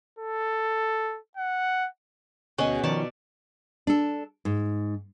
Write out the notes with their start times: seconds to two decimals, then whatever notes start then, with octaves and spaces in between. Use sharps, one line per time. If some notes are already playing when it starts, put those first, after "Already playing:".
0.19 A4
1.37 F#5
2.58 D2 B2 C#4 F#4 G#4 D#5
2.84 D#3 F3 C#4 D5 A5
3.87 D4 A4
4.45 G#2